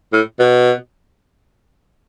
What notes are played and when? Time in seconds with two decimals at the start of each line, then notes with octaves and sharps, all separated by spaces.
0.13 A2
0.39 B2